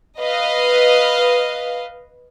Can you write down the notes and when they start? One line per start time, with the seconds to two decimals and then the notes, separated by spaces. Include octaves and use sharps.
0.18 B4 D#5 F5